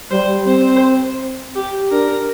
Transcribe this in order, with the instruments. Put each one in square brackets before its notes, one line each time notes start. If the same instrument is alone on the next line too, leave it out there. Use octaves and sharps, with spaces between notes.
[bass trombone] G3 [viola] C5
[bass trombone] C4 [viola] C5
[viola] G4
[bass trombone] D4 [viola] A#4